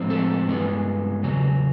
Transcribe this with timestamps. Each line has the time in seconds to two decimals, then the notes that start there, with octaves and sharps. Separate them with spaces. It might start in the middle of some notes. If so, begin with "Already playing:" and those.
Already playing: A2 F3 G#3 C4
0.10 A4
0.48 G2 E3 G#3 B3
1.23 E2 C#3 F#3